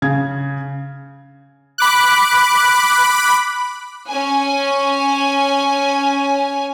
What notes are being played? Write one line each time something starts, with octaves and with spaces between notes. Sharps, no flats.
C#3 G#6
B5 D6 F#6
C#4 G#5